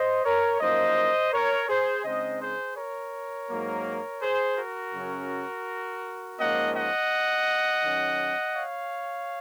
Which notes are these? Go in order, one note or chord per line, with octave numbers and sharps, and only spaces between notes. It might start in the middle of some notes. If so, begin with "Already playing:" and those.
Already playing: C5 D#5
A#4 C#5
F#2 F3 A#3 D#4 C5 D#5
A#4 C#5
G#4 C5
C#3 G#3 C4 D#4 C5 D#5
G#4 C5
A#4 C#5
G#2 F#3 A#3
G#4 C5
F#4 A#4
F#2 C#3 F#3 C#4
G#2 F3 A#3 C#4 D#5 F#5
D#5 F#5
D#3 F#3 C#4
C#5 F5